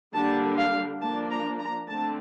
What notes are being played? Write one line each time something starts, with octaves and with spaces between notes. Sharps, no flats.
D3 G3 A#3 D4 A5
F5
F3 A#3 D4 A5
A#5
A#5
D3 A3 C4 A5